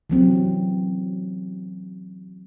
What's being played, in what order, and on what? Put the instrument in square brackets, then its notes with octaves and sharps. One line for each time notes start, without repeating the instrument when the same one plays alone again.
[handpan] E3 F#3 C4